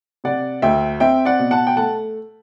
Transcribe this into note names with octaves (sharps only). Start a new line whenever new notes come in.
C3 D5 F#5
D2 E5 G5
C4 E5 G5
D5 F#5
B2
F#5 A5
G5
A3 F#5 A5